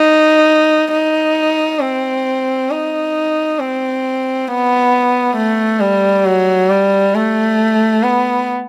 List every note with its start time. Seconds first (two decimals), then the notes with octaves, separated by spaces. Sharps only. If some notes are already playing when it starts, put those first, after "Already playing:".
Already playing: D#4
0.92 D#4
1.81 C4
2.70 D#4
3.59 C4
4.48 B3
5.36 A3
5.80 G3
6.25 F#3
6.69 G3
7.14 A3
8.03 B3